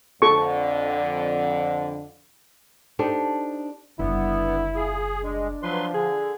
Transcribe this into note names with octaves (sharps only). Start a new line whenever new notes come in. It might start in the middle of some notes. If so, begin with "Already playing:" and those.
F2 D3 A4 C#6
D4 D#4 G4 A4 C5
F#1 D3 G3 B3 E4
F4 G#4
G#3 D4
F3 F#3 B4 C6
D3 G#4